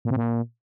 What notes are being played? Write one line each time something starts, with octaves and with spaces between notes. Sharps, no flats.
A#2
C3
A#2